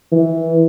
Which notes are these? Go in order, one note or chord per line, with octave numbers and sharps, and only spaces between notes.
E3